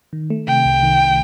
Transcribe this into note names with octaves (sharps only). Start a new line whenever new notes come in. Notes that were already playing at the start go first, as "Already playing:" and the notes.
D#3
A3
C3 G5
C2
D#3